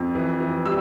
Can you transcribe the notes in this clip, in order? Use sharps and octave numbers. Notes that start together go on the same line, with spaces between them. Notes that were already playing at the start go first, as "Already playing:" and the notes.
Already playing: F2
E3
E3
G3 E6